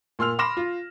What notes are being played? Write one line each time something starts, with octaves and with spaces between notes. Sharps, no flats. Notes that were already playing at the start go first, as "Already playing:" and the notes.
A#2 C6 E6 F6 F7
B5 C6 D6 F6 A#6 E7
F4